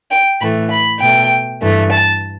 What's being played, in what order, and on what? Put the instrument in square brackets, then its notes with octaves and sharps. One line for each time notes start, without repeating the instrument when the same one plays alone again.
[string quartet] G5
A2 E3 A3 B5
B5
B2 A3 G5
G2 E3 A3
A5